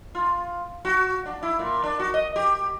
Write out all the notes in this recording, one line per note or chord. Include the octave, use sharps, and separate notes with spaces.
F4
F#4
D4
E4
A#2
D4
F#4
D#5
G4